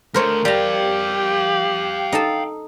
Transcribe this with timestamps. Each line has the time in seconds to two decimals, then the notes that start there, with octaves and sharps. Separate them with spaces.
0.14 D2 A3 A#4 C5 C#5
0.45 G3 G4 F5 G5 A#5
2.12 D#4 A4 A5